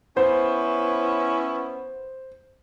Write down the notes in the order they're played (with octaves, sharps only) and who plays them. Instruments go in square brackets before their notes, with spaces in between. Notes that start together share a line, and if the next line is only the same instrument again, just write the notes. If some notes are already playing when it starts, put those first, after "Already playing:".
[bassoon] B3 [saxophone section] C#4 E4 [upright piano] C5